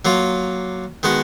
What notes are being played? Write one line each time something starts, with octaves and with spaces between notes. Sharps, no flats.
F#3 A#3 F4
D#3 G#3 B3 F#4